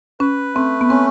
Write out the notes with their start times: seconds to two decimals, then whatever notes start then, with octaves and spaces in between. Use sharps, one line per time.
0.20 C#4 B4
0.55 A3 C4
0.81 B3
0.90 C4 C#4